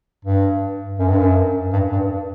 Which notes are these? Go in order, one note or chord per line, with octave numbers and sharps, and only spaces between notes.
G2
F#2
G2
F#2
G2
G2